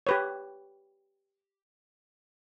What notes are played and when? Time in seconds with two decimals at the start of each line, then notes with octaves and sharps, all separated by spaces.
0.07 G4 B4 C#5